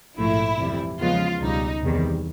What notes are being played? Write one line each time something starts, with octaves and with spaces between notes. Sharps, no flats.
A#1 G#2 F3 A3 E4
F2 C3 E3 G3
E2 C#3 F3 G#3 B3 F4
C#2 B2 G3 D#4
E2 C3 D#3 G3